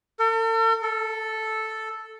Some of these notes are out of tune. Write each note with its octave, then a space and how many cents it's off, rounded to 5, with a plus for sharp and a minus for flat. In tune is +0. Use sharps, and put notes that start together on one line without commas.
A4 +45
A4 -5